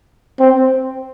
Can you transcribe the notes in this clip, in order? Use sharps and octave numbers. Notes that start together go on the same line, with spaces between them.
C4